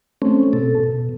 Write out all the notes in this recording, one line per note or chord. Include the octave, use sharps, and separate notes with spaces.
A3 C4 C#4
B2 A4
B2